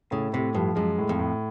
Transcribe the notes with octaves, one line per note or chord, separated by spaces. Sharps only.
A2 C#3
A2 C3
G2 F3
F#2 G#3
A2
F2
A2